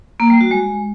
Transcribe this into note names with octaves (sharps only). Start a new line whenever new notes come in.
A#3
G3
F#4
G#3